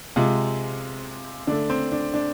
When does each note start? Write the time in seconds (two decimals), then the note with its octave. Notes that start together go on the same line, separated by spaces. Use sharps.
0.16 C3 G#3 F4
1.47 D3 A3 D4
1.70 C4
1.92 D4
2.14 D4